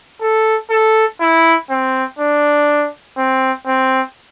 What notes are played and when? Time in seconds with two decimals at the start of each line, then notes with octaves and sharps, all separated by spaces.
0.21 A4
0.70 A4
1.21 E4
1.70 C4
2.19 D4
3.18 C4
3.67 C4